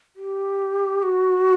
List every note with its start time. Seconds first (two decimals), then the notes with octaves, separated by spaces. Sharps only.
0.16 G4
1.03 F#4